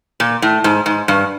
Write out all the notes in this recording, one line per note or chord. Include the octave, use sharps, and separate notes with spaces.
A#2
A2
G#2
G#2
G2